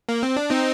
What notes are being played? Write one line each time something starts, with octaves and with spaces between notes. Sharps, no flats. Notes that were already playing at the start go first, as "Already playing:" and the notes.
A#3
C4
D4
C4 D#4